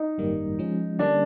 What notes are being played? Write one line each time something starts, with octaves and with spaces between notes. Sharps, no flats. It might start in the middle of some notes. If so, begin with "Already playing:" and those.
Already playing: D#4
G#1 F#2 D#3 G3 A#3
F3 G#3 C#4
D3 G3 A#3 C#4 D4